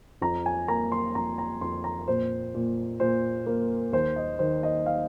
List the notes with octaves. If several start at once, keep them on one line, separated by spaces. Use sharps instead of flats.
F2 A#5
G#5
A#3 A#5
C6
F2 A#5
A#5
F2 C6
A#5
A#2 C5
A#2
A#2 C5
A#3
D#2 C5
D#5
D#3 C5
D#5
F5